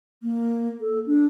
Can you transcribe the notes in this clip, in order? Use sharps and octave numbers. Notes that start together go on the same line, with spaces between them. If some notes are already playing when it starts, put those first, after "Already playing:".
A#3
A4
D4